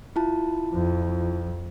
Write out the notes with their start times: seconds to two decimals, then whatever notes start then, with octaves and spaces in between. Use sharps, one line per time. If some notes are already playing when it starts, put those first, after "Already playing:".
0.16 E4 F4 A5
0.74 F2